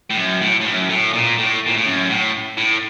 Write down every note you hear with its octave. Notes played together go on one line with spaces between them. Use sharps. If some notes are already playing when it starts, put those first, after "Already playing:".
A2
F#2
A2
A2
F#2
A2
A#2
A2
A#2
A2
F#2
A2
A2